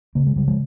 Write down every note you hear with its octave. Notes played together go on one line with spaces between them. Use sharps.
C#3 A#3
G#3
C#3 G3
F3 G#3